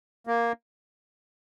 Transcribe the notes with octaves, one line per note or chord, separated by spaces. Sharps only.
A#3